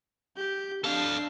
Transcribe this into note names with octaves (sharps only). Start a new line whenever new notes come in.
G4 G6
D4 A4 F5 C7